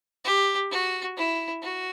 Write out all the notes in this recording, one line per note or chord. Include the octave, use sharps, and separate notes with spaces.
G4
F#4
E4
F#4